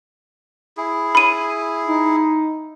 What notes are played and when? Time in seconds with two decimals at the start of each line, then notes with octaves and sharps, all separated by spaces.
0.77 E4 G#4
1.15 B5 D#7
1.87 D#4